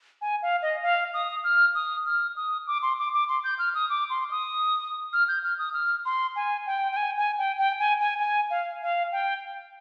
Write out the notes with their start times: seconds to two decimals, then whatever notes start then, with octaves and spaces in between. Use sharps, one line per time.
0.22 G#5
0.42 F5
0.62 D#5
0.83 F5
1.14 D#6
1.44 F6
1.75 D#6
2.06 F6
2.36 D#6
2.67 D6
2.83 C6
2.98 D6
3.13 D6
3.29 C6
3.44 G6
3.59 F6
3.75 D#6
3.90 D6
4.10 C6
4.31 D#6
5.13 F6
5.28 G6
5.44 F6
5.59 D#6
5.74 F6
6.05 C6
6.36 G#5
6.66 G5
6.92 G5
6.97 G#5
7.18 G#5
7.38 G5
7.58 G5
7.79 G#5
8.00 G#5
8.19 G#5
8.50 F5
8.82 F5
9.12 G5